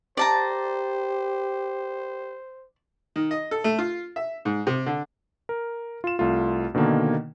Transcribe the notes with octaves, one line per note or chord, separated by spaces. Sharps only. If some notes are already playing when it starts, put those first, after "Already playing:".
G4 C5 D5 A5 A#5
D#3
D#5
A4
A3
F4
E5
G#2
C3
D3
A#4
F4 E7
C2 A3 F4
B2 D3 D#3 A#3